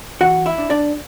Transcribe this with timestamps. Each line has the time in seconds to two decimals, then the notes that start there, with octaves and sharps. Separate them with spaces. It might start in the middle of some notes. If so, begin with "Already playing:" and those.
0.21 E3 F#4 F#5
0.46 E4 E5
0.58 D4
0.70 D4 D5